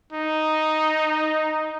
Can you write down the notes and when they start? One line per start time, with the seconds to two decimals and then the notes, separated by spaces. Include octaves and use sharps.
0.13 D#4